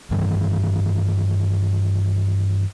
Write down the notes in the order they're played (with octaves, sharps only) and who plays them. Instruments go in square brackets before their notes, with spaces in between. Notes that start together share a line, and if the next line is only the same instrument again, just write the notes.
[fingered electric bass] G2 D#3 E3 G3